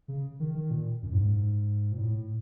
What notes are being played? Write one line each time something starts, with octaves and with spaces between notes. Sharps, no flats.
C#3
D#3
D#3
A#2
F#2
A2
G#2
A#2
A2